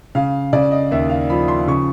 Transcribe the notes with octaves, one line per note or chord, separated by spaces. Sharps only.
C#3 F5
C#3 D5
D#5
D#2 E5
F5
F3 B5
C6
C#3 C#6